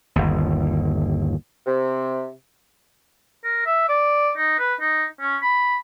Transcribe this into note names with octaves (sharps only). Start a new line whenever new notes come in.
G1 D#2
C3
A#4
E5
D5
D#4
B4
D#4
C#4
B5